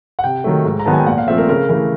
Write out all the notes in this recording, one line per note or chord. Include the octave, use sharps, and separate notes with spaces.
F#5
C3 G5
D#3 F#3 A3
G#2
A#5
D#3 F#3 B3 A5
G#5
G5
A#2 F#5
F5
F3 A3 C4 E5
A#4
C#3 A#4
E3 A3 A#4